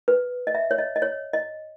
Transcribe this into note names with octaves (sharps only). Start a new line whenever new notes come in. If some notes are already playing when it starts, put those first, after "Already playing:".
B4
D#5
E5
C#5
D#5
D#5
C#5
D#5